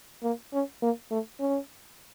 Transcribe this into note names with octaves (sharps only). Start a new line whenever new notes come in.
A#3
C#4
A#3
A3
C#4